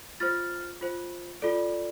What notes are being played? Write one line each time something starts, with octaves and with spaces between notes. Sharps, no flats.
F4 C5 F6 A6
F4 C5
F4 A4 D5